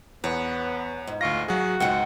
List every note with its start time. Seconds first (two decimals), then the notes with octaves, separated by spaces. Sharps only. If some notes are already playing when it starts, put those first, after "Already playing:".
0.24 E2 B3 C#5
1.07 G#2
1.21 D2 F4 C#6 A#6
1.48 F#3 F#4 G#4
1.80 C#2 G#2 G#3 F#5 G5 C#7